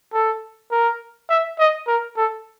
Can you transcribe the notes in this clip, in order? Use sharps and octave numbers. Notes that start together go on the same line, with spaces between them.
A4
A#4
E5
D#5
A#4
A4